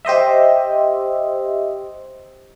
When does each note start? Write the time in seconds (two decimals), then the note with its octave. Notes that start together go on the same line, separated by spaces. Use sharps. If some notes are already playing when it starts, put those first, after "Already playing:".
0.05 G4 C5 D#5 E5